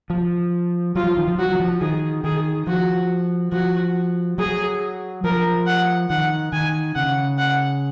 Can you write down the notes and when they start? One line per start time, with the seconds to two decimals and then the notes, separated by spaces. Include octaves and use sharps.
0.10 F3
0.96 F#3 F4
1.07 F3
1.17 D#3
1.28 F3
1.39 F#3 F#4
1.55 D#3
1.60 F3
1.81 D#3 G#4
2.24 D#3 G#4
2.67 F3 F#4
3.52 F3 F#4
4.38 F#3 G#4
5.24 F3 A#4
5.66 F#5
6.10 D#3 F#5
6.53 D#3 G#5
6.95 C#3 F#5
7.38 F#5